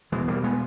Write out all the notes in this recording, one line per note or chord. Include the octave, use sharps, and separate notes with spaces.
E2 B2 E3 G#3
G3 A#3
G#3 B3